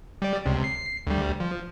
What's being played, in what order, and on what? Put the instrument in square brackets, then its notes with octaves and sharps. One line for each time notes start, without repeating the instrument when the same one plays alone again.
[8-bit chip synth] G3 D5
C#2 C3
C7
D2 G3
F3